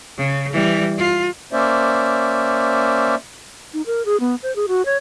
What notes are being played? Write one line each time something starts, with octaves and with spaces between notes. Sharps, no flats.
C#3
E3 G3
F4
A#3 C#4 C5 D5 E5
D#4
A#4
G#4
B3
C5
G#4
F#4
C#5